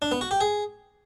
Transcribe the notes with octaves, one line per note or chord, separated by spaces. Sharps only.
D4
B3
F#4
G4
G#4